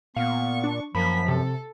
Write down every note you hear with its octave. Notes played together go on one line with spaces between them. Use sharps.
A#2 B3 F5 C#6
D4
F#2 F3 A#3 B5 B6
C3 A4